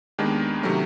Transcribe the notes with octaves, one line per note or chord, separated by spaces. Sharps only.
D#2 D#3 G#3 B3 D4
C3 D#3 F#3 A3 C#4